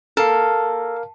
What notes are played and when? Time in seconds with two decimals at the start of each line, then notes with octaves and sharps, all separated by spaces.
0.17 A4 A#4 F5